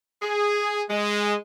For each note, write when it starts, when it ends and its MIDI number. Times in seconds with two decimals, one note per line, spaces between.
0.22 0.82 68
0.90 1.35 56